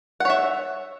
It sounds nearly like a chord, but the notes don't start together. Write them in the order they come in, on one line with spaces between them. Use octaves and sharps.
F#5 C#5 E5